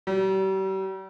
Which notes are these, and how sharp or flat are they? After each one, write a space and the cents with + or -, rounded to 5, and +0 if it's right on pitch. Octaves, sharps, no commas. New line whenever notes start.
G3 -40